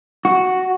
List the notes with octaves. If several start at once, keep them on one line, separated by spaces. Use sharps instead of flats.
F#4